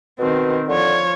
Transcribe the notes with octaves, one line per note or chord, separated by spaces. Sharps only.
B2 D#3 C4
D3 F3 C#5